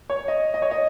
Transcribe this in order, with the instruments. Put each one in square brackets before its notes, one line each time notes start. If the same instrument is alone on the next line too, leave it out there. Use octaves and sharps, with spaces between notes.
[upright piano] C#5
D#5
D#5
C#5
D#5